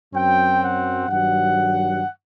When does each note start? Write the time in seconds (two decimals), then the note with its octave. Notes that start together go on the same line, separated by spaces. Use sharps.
0.14 F#2 F#3 C4 G5
0.61 F#5
1.09 G2 D#3 F#3 F#5